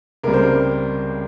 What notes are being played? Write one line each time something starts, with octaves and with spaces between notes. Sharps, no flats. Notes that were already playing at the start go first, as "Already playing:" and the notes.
C#2 C3 G3 A#4
C5
A#4